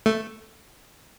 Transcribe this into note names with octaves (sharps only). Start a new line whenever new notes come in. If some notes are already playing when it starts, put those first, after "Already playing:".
A3